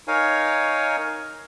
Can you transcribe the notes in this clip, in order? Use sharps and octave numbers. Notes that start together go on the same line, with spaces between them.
D#4 A#4 C#5 F5 G#5